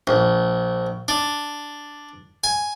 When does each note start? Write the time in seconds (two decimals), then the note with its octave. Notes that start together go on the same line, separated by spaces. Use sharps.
0.07 A#1
1.08 D4
2.44 G#5